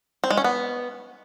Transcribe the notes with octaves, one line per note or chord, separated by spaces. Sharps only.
C4
G#3
C#4
B3